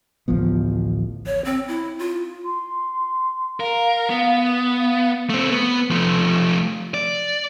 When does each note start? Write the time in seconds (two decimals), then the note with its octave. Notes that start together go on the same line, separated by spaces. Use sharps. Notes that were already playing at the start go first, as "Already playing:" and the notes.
0.28 A1 D2 F3 B3
1.26 C#5
1.45 C4
1.68 E4
1.99 F4
2.45 C6
3.60 A#4 F5
4.10 B3
4.80 F5
5.30 A3 C4
5.52 B3
5.91 F3 A3
6.94 D5